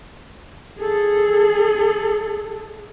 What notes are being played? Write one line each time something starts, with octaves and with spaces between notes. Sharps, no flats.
G#4 A4